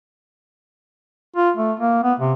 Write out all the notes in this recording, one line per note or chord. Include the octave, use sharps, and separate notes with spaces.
F4
A3
A#3
B3
C3